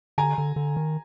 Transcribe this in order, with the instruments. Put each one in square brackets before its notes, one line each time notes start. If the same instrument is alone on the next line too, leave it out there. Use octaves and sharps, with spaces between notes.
[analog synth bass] D3 [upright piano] G#5 A#5
[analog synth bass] D3
D3
D#3